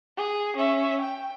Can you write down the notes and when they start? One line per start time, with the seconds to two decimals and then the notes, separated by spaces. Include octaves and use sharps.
0.17 G#4
0.57 C#4 E5
1.01 G5